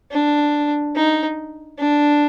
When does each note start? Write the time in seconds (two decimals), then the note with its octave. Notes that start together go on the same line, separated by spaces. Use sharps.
0.11 D4
0.95 D#4
1.78 D4